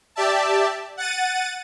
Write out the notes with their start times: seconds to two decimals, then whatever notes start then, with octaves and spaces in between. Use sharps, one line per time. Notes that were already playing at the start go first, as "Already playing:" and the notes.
0.16 G4 D5 E5 A5
0.97 F#5 A6 D#7